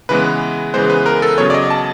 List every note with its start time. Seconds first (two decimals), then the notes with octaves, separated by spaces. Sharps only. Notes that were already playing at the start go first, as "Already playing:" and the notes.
0.09 C#3 E3 G#3 B3 B4
0.74 C#3 E3 G#3 B3 C5
0.90 B4
1.06 A#4
1.22 A4
1.38 C#3 F#3 B3 C#5
1.50 D5
1.54 D#5
1.70 A5